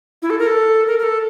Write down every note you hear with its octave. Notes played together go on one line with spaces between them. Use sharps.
E4
A4
A#4
A4
A#4
A#4
A4